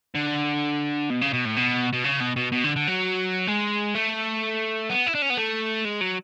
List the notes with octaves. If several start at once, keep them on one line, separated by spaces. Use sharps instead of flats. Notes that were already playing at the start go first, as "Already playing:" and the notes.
D3
B2
C#3
B2
A2
B2
B2
C#3
B2
B2
B2
D3
D3
F#3
G#3
A3
B3
E4
D4
C#4
B3
A3
G#3
F#3